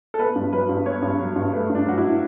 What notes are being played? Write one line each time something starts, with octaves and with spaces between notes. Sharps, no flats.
A4
B3 B4
G2
F#3 B4
G2
B3 C#5
G2
F#3
G2
A3 B4
G2
D4
F#3 F#4
E4